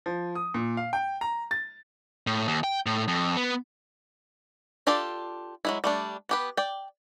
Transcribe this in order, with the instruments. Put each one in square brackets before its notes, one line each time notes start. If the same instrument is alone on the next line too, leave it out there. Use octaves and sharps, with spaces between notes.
[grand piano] F3
D#6
A#2
F5
G5
A#5
A6
[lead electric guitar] A2
D#2
G5
A2
F2
B3
[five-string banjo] D4 F4 G4 A4 D5
F#3 G#3 E4
G3 A3 D4
B3 G4 B4
D5 G5